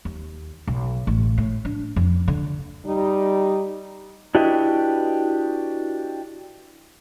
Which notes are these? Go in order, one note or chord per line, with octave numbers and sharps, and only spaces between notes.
D#2
B1
A1
A2
D4
F2
D3
G3 D#4
D4 E4 F#4 G4 B4 D#5